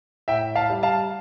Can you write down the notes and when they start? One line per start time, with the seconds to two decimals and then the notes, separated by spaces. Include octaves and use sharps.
0.28 A2 E5 G5
0.56 F5 A5
0.70 G3
0.83 F5 A5